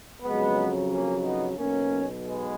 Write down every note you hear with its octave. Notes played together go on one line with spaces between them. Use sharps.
F2 C#3 F#3 G#3 B3
A#3 C#4
B3 D#4
B1 B2 F#3 A#3 C#4
G#3 B3